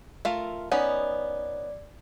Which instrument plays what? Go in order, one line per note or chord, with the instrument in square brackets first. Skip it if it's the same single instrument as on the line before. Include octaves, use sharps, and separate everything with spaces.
[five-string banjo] A3 F4 A#4
[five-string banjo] B3 C#4 D#4 [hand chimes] D5